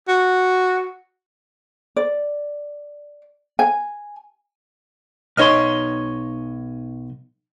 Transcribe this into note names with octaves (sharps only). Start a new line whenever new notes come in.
F#4
D5
G#5
B1 D#4 C#5 D#5 C6 F6